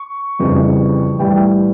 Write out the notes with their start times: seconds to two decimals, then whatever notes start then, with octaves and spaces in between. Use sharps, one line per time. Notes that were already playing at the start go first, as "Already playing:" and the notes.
Already playing: C#6
0.39 F2 C#3 E3 G3
1.18 A2 E3 G3 G5